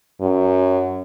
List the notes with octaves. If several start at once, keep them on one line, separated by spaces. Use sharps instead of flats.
F#2